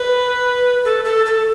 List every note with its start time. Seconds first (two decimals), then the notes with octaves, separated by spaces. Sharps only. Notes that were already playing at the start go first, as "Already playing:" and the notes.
Already playing: B4
0.85 A4
1.04 A4
1.26 A4